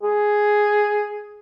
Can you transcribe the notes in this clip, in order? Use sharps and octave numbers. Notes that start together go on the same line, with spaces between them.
G#4